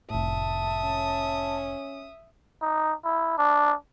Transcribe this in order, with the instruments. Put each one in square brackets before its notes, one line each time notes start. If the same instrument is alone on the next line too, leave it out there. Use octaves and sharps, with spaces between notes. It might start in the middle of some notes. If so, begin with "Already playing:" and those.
[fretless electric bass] F1 A2 [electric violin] E5 D#6 [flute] A5
[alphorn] C#4
[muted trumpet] D#4
E4
D4